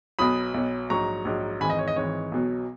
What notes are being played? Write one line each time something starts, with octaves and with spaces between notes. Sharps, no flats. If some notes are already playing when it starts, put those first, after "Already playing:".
B1 B2 F#3 B5 D#6
B1 B2 F#3
A#1 G#2 F#3 A#5 C#6
A#1 G#2 F#3
G#1 G#2 E3 G#5 B5
D#5
C#5
D#5
G#1 G#2 E3 C#5
B1 B2 F#3